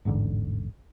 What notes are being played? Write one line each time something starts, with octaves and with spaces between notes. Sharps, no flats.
E1 A1 G#2 D3